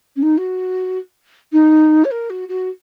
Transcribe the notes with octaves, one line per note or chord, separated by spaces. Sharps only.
C#4
D#4
F#4
D#4
C#5
A#4
F#4
F#4